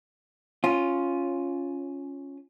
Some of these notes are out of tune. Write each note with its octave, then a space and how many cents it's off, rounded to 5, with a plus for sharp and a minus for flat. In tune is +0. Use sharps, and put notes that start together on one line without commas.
C#4 +0 F4 +0